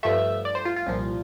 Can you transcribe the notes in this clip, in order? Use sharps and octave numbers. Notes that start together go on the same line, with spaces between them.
G2 F3 A3 E5
D5
C5
F4
F4
C2 A#2 F3